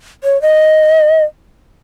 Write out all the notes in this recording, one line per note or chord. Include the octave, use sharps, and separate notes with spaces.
C#5
D#5